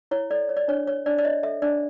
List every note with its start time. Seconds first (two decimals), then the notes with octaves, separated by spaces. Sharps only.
0.11 E4 C#5
0.31 A4 D5
0.49 C#5
0.57 D5
0.68 D4 C#5
0.87 C#5
1.06 D4 D5
1.18 D5
1.25 C#5 D#5
1.43 A4 E5
1.62 D4 D5